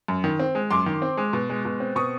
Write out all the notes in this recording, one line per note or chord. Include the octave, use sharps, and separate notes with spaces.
F#2
D#3
C4
G#3
F#2 C6 D6
D#3
C4
G#3
B2
G#3
B2
C4
B2 C#6 D#6